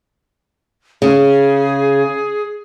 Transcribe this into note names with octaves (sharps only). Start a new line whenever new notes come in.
C#3 G#4